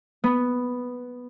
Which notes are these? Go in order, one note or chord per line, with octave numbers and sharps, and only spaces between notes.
B3